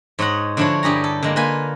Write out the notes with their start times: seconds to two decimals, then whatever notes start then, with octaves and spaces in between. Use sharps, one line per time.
0.19 G#2 C#5 D#5 F#5
0.57 D3 F3 D4 E4 F#4 C#5
0.83 G2 G4 G#4 A#5
1.04 A4
1.23 D3 G#3 A#3
1.36 A#3 F4 B4 G#5